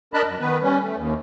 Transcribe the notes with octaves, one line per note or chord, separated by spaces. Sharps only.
D4 A#4 D#5 A5 B5 F#6
F#2
D#3 B3 B4
G3 C#4
A3
D#2